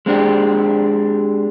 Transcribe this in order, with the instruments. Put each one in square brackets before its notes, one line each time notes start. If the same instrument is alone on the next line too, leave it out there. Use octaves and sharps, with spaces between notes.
[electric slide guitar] G#3 C4 D4 G4